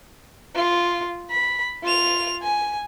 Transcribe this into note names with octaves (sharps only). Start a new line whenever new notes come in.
F4
B5
F4 F7
G#5